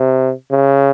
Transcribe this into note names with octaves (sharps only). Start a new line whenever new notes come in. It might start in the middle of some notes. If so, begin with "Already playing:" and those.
Already playing: C3
C#3